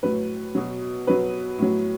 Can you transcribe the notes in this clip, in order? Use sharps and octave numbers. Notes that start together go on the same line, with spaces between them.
A2 F#3 B4
B2 F#3
B2 F#3 B4
A2 F#3